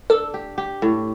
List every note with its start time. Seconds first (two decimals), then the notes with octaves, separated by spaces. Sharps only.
0.10 D4 A4
0.34 G4
0.58 G4
0.82 A2